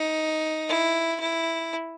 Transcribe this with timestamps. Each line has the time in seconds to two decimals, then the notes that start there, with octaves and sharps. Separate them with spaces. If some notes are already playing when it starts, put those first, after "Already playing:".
Already playing: D#4
0.69 E4
1.20 E4